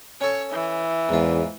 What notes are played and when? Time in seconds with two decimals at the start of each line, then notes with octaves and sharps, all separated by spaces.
0.21 C#4 A4 C#5
0.52 E3
1.09 E2 G#2 F4